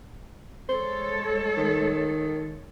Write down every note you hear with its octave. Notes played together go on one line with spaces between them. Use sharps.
G#3 A4 C5 C#5
D#3